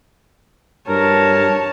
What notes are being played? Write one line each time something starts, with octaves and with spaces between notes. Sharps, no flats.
G2 A#4 C#5 A5